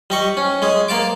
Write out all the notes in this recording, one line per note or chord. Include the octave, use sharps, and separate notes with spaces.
G3 D#5 C#6
C#4
G#3 G#4
A#3 F5 A5 D6